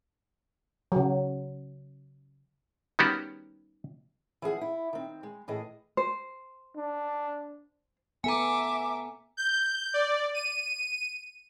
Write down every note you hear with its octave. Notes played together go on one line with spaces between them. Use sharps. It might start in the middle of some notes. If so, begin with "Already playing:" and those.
C#3 F#3
D#3 G3 B3 C#4 F#4 G4
E3 F3 G#4 F#5
E4
D#3 C4
G#3
A2 E3 G#4 D#5
C5
D4
B3 A4 E5 G#5 A#5 D6
G6
D5
D#7